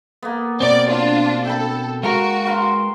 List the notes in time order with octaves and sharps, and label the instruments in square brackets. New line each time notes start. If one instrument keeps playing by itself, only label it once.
[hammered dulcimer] A#3 B3
[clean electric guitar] B2 C4 [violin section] D5
[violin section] D4 F4
[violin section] A4 [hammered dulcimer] G5 B5
[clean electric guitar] G#3 A#4 [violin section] F#4 [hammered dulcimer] F5 C#6
[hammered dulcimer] B4 F5 C6